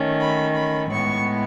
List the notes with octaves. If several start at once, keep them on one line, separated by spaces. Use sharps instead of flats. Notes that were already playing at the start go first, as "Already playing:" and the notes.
Already playing: D#3 A3 C#4
B5
B5
A2 G#3 B3 C#6